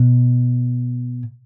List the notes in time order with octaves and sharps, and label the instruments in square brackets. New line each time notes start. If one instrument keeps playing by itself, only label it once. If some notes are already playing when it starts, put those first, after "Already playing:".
Already playing: [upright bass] B2